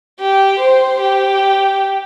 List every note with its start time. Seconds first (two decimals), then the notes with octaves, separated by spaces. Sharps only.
0.20 G4
0.60 C5
1.01 G4